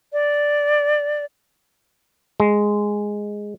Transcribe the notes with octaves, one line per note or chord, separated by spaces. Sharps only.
D5
G#3